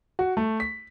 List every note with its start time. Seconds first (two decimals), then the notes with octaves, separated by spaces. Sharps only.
0.19 F#4
0.37 A3
0.60 B6